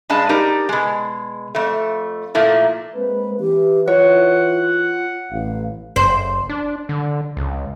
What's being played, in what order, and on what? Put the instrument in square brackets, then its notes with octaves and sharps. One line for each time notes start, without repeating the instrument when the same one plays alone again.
[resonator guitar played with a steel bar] G2 G#3 D4 A5
D#4 G4 A#4 D5
B2 G#3
F2 A3
A#2 F3 A3 A#3 E4
[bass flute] G#3 [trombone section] A#3 C4 B4
[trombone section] E3 [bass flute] G4
[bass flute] F4 [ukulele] C#5 [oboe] F#5
[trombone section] A1 [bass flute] F5
[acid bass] F#1 [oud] C5
[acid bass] D4
D3
C#2